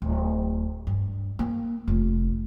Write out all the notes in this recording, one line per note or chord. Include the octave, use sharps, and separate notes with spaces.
D1
G2
A#3
F1